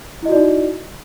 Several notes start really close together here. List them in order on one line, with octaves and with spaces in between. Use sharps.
E4 D#5 F#4 D5 D#4